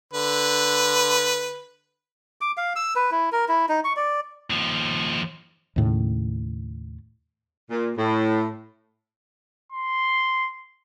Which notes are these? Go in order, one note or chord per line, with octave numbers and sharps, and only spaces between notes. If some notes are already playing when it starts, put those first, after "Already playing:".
D3 B4
D6
F5
E6
B4
E4
A#4
E4
D#4
C#6
D5
D#2 F3
D#2 A2 C#3
A#2
A2
C6